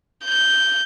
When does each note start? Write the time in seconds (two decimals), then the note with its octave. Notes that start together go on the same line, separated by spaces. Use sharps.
0.24 G6